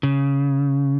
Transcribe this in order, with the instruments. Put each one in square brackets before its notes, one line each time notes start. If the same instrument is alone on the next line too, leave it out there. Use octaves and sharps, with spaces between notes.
[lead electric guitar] C#3